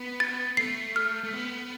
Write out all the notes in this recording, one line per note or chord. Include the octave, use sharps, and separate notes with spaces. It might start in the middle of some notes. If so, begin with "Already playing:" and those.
Already playing: B3
A6
A3 C7
F6
A3
B3